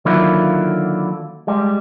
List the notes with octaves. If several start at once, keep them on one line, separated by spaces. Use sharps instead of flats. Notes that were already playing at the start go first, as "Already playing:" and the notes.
D3 D#3 F#3 A#3 E4 F4
G3 G#3